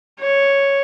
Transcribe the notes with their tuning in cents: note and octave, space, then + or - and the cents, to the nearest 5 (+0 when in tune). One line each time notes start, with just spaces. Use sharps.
C#5 +0